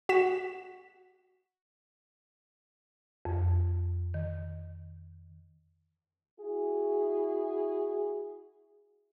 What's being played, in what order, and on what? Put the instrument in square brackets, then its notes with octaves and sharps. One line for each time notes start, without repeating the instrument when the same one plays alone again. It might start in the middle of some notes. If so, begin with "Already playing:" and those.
[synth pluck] F#4 B6 E7
[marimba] F2
D#3
[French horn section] E4 F#4 G#4